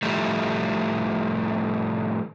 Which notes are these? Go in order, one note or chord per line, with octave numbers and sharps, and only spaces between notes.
A2 D#3 F3 G3 A3